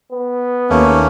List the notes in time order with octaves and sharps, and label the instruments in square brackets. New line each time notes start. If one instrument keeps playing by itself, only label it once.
[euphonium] B3
[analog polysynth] D#2 [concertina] A3 A#3 C#4